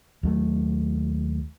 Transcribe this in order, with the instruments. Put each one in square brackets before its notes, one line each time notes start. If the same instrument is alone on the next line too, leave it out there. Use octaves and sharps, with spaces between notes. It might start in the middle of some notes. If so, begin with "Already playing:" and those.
[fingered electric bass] D#2 F#3 A3